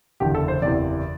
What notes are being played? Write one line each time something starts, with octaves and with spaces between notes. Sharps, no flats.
F#1 E2 D3 G4
A4
C5
F#1 E2 C3 E3 D5